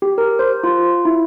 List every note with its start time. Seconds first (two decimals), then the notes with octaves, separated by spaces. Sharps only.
0.02 G4
0.18 A#4
0.39 C5
0.64 F4
1.05 E4